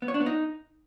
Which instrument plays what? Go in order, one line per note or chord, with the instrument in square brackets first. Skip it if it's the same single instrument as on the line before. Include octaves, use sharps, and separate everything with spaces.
[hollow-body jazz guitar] B3
C#5
D4
B3
D#4